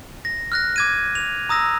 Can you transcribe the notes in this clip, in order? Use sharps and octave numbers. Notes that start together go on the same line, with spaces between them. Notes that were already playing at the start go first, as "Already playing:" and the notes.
A#6
F6 F#6 A#6
D6 G#6 D#7
F7
A#5 D#6 E6 A#6